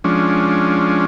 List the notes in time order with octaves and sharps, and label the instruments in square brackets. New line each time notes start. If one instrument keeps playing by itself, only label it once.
[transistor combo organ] F3 G#3 C#4 D4